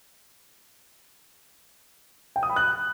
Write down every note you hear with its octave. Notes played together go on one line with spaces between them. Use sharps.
G5
D#6
B5
F#6